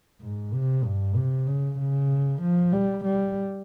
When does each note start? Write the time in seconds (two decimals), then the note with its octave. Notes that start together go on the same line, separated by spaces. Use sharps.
0.21 G#2
0.53 C3
0.84 G2
1.16 C3
1.47 C#3
1.79 C#3
2.42 F3
2.73 G3
3.05 G3